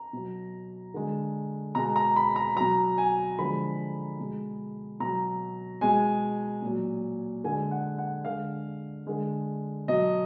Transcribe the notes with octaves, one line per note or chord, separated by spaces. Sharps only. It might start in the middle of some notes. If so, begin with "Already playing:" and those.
Already playing: A#5
B2 F#3
D3 G#3
B2 G#3 A#5
A#5
B5
A#5
B2 F#3 A#5
G#5
D3 F3 G#3 B5
B2 G#3
B2 F#3 A#5
B2 G#3 G#5
A#2 F#3
D3 G#3 G#5
F#5
F#5
D3 G#3 F5
D3 G#3
B2 F#3 D#5